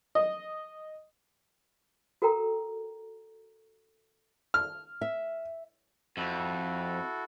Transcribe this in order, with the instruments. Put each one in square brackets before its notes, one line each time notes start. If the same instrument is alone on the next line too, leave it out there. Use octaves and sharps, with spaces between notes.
[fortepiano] D#5
[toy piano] F#4 A4 A#4 G5 A#5
[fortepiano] F6
[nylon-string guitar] E5
[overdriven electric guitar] F2 [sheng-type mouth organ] E4 F#4 A4